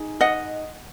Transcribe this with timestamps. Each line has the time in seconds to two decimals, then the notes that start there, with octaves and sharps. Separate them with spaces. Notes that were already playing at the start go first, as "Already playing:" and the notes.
Already playing: D#4 G#4
0.21 D#5 F#5